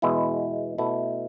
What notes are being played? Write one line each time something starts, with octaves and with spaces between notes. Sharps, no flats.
E2 B2 G#3 B3 E4
B2 A3 E4